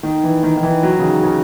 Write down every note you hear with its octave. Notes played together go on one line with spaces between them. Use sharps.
D#3
E3
D#3
D#3
E3
F#3
C#3
D#3
C#3